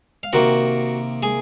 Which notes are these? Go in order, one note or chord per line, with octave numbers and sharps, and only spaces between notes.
F5
C3 D#3 A#3 F#4 F#5
G#4 G#5